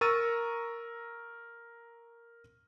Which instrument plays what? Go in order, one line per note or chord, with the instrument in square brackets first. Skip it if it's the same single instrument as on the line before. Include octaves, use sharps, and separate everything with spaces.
[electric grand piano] A#4 A#5 C#6 E6 A6 D#7